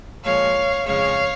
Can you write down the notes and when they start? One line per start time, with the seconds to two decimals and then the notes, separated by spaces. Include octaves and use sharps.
0.23 A#2 F3 G#3 C#5 F5
0.86 F2 C#3 G#3 C#5 F5